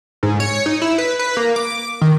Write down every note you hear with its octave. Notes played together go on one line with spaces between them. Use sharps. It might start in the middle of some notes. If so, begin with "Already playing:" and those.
G#2
C#5
D#4
E4
B4
B4
A#3
D6
D#3